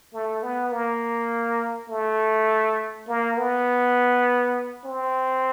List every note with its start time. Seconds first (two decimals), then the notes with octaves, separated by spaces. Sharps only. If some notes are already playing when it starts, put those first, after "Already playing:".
0.14 A3
0.43 B3
0.72 A#3
1.89 A3
3.08 A#3
3.38 B3
4.85 C4